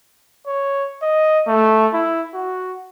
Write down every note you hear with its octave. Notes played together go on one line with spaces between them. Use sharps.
C#5
D#5
A3
E4
F#4